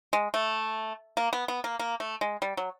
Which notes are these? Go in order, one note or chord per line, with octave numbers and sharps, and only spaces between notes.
G#3
A3
A#3
B3
B3
A#3
A#3
A3
G#3
G3
F#3